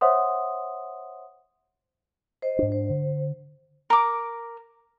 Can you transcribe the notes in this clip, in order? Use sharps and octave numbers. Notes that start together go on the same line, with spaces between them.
C5 C#5 E5 F#5 C6 D#6
C5 D#5
G#2 D4
C5
D3
A#4 D6